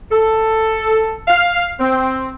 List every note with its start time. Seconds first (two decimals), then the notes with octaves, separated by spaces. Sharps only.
0.11 A4
1.28 F5
1.80 C4